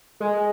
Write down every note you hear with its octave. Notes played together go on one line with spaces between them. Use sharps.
G#3